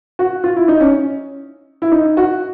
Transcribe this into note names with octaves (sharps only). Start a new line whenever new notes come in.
F#4
F4
E4
D#4
C#4
E4
D#4
F#4